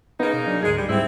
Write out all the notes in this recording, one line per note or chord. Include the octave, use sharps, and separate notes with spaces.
C#3 A#3 B3 D#4
B2
F#3 D4
D2 G#2 G#3 G#4
G3
G#2 G3 C4 E4